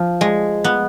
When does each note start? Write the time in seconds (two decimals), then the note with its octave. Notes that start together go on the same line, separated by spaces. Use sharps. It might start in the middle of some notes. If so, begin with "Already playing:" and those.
Already playing: F3
0.21 G#3
0.64 B3